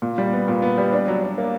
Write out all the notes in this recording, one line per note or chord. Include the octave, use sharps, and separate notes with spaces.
A#2
G3
B3
A#2
B3
G3
D4
F#3
D4
A#3